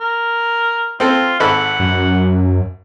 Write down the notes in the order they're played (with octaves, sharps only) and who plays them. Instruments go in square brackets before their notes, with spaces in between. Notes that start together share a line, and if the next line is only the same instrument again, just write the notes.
[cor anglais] A#4
[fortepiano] C4 A4 [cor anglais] F4
[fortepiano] G#1 A4 B5 [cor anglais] F#5
[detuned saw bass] F#2